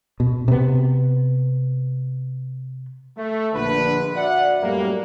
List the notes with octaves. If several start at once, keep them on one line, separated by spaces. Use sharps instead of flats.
B2
C3 B3
A3
A#1 D3 B4
F#4 D5 E5 F#5
F#2 A2 G3 A#3